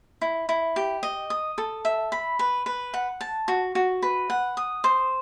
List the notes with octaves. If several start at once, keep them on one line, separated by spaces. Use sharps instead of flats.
E4
E4
G4
D#5
D#6
A4
E5
B5
B4
B4
F#5
A5
F#4
F#4
B4
F#5
D#6
C5